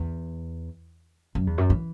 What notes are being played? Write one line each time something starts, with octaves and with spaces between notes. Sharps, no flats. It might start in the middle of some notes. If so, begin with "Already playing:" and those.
Already playing: E2
F#2
E2
F#2
E3